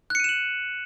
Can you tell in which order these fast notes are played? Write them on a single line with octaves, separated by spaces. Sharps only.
F#6 C#7 D#7 E7 F#7